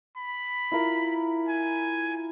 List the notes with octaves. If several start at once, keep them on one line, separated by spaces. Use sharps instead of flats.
B5
E4 F4 A#4
G#5